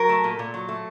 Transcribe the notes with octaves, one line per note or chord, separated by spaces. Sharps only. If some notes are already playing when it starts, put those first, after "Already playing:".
Already playing: F#3 A#4
A3
A#2
A#2
F#3
A3